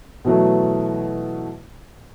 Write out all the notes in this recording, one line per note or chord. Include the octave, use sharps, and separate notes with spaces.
B2 E3 F#3 A3